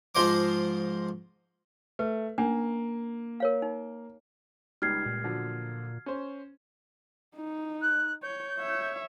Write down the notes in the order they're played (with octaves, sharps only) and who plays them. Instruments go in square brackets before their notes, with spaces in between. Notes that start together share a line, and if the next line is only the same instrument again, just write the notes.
[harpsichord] G#2 F3 F4 C5 D#5 D6
[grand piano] A3 [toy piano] B4
[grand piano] A#3 [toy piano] C#4 D4
[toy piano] A#4 C#5 F5
D#4
[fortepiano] C#2 G3 [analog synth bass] D#4 [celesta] F6 G#6 C7
[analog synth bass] A#2
[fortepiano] D3 F3 F#3
C#4 C5
[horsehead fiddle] D#4
[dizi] F#6
[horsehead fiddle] C#5 [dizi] G6
[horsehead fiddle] C#5 E5